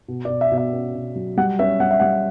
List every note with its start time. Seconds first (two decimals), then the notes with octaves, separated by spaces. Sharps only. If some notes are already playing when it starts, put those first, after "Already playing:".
0.08 B2
0.25 D5
0.30 B2
0.41 E5
0.52 B2
0.57 E5
0.73 C#4
0.94 B2
1.16 F#3
1.37 G3 F#5
1.59 C#4 E5
1.80 G3 F#5
1.91 E5
2.00 G3 F#5